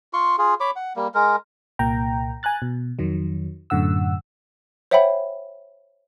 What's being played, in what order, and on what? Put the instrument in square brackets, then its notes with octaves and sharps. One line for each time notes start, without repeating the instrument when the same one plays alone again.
[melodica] F4 C6 C#6
F4 G#4
C#5 B5 D6
F#5
G3 A#3
G#3 A#4
[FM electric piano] C2 A#2 A#3 G5 A#5
G#5 A#5 F#6 A6
B2
F2 D#3 F#3
F#2 A2 D3 F#5 E6
[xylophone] C5 C#5 E5 F#5 G5 B5